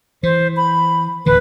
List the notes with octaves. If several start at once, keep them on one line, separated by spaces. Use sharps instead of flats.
E3 C5
B5
D1 D#2 E3 B4